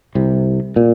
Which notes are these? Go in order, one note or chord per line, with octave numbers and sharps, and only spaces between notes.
C2 C3
A#2